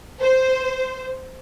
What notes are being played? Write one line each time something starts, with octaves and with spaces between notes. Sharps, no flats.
C5